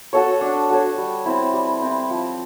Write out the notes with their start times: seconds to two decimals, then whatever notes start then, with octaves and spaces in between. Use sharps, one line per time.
0.13 F#4 A4 C#5
0.41 D4
0.70 F#4 A4 C#5
0.98 G3
1.26 C4 E4
1.53 G3
1.82 C4 E4
2.10 F3